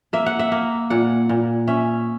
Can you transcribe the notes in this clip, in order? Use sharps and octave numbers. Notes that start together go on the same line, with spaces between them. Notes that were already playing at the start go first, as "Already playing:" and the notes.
A#3 E5
F#5
E5
A#3
A#2 F#5
A#2
C#4 E5